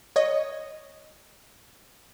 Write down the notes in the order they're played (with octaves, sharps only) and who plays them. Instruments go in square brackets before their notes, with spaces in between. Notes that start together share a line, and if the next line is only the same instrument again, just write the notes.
[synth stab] C#5 D#5